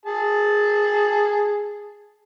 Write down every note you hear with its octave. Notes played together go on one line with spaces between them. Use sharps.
G#4 A5